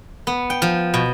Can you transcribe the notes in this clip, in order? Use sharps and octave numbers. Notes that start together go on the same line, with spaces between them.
B3
G5
F3
B2